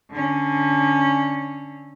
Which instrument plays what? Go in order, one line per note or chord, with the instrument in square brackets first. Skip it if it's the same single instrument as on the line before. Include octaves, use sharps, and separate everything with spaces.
[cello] D3 C#4